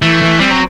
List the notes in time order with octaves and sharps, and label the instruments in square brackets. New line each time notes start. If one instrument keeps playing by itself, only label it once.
[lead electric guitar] E3 [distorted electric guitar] A3
[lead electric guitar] E3
[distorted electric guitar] G3 [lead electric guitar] C4
[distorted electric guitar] F#3